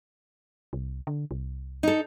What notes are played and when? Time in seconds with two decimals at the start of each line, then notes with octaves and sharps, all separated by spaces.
0.73 C2
1.07 D3
1.31 C2
1.83 D#4 A4